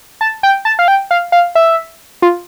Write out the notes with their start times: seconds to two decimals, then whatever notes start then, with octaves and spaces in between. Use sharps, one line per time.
0.21 A5
0.43 G5
0.65 A5
0.79 F5
0.88 G5
1.11 F5
1.32 F5
1.55 E5
2.22 F4